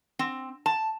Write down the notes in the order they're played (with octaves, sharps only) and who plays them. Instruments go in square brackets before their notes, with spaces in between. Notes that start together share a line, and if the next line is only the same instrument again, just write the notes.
[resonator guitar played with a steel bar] C4
A5